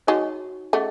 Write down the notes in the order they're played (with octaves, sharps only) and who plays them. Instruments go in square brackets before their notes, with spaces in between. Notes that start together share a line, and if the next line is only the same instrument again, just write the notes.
[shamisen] G#3 [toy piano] D#4 F#4 C#5 F#5 C#6
[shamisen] A3 [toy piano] C#4 G#4 D#5 F#5